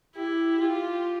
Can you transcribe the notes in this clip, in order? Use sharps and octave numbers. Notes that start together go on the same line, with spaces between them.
E4 G4
F4 G4